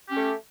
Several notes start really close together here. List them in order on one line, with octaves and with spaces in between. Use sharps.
G4 C#4 A3